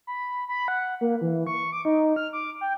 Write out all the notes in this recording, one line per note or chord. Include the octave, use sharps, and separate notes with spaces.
B5
B5
F#5
A#3
E3
C#6
D6
D#4
F6
D6
G5